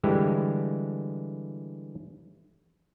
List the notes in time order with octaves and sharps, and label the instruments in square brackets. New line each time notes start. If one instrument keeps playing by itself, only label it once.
[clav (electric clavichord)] D3 E3 G3 G#3 E4 G4